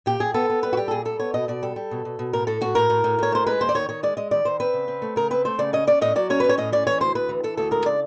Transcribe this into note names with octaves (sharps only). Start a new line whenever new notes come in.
A#2 G4
A#2 G#4
B3 A4
B3
G3 B4
F#4
G3 G4
A4
A#2 G#4
G3 A4
B3 C#5
B2 D#5
B2 D5
G3 A4
G3
B2
B2
B2
A2 A#4
A2 A4
A2 F#4
A2 A#4
A2
A2
A2 C#5
A3 C5
G#3 B4
D#2 C5
D5
D#3 C#5
D#3 C#5
G#3 D5
G#3 D#5
D#3 D5
D#3 C5
C4 B4
C#3
C4
A3
C#3 A#4
C4 B4
A3 C5
C#3 D5
C#4 D#5
C#4 D5
A2 D#5
F#3 D5
C#4 C#5
C#4 B4
C#5
A2 D#5
C#4 D5
E3 C#5
D2 C5
D2 B4
E3
E3 A4
D2 A4
G#3 A#4
C#3 D5